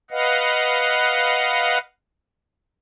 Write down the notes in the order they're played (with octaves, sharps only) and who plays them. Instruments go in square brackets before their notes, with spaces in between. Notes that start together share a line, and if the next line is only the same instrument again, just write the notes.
[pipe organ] B4 D#5 F5 F#5